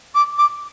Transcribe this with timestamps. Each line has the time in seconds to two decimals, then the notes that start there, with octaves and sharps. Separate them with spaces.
0.14 D6
0.38 D6